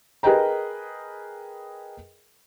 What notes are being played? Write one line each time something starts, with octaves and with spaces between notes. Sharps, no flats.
G#4 A#4 B4 D#5 G5 A#5